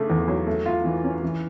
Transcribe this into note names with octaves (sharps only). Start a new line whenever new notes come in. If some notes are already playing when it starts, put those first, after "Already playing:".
Already playing: C#3 A3 D4
E2
F#3
A3
F4
E3
C#4
E3